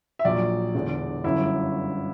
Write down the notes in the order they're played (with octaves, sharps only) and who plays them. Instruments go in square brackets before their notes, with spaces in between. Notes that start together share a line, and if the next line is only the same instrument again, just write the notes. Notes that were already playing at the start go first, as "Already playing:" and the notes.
[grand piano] E5
A#1 A#2 F#3 D5
E1 E2 D3
G1 F#2 D3 E4